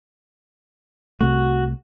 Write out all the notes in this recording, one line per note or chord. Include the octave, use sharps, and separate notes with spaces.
C2 C3 A3 F#4